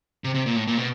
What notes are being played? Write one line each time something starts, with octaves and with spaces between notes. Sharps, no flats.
C3
C3
A#2
A2
A#2
B2